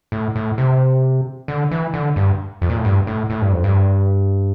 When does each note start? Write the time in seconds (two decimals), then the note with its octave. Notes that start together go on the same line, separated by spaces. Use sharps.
0.12 A2
0.35 A2
0.58 C3
1.48 D3
1.71 E3
1.94 D3
2.16 G2
2.62 F2
2.70 A#2
2.77 A2
2.85 G2
3.07 A2
3.30 A2
3.41 G2
3.52 F2
3.64 G2